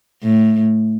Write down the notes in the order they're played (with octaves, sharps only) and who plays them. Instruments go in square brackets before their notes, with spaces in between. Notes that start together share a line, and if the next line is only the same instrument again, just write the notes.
[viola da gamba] A2